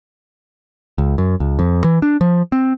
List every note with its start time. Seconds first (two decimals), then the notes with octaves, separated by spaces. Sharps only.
0.98 C#2
1.18 F#2
1.40 C#2
1.59 F2
1.84 E3
2.02 D4
2.21 F3
2.52 C4